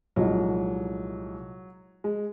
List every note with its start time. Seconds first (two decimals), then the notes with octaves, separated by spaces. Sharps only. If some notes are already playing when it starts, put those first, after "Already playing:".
0.16 C2 A#2 F3 F#3 G#3 D#4
2.04 G#3